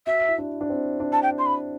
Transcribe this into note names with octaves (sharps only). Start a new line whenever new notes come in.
F#4 E5
E4
D4
D4
C4
D4
A5
G5
C6
B5